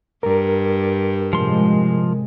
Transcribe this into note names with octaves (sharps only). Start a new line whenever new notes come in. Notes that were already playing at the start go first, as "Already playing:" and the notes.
G2 G3 A#4
A2 C3 F3 G#3 C6